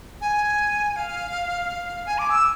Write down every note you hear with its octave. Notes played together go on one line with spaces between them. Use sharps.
G#5
F5
G#5
D6
E6